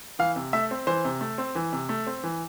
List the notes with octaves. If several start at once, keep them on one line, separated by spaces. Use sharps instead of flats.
E3 F5
C3
A3 E5
C4
E3 C5
C3
A3
C4
E3
C3
A3
C4
E3